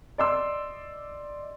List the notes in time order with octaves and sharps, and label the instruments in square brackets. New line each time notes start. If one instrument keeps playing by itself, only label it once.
[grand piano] D5 D#5 C6 D6 E6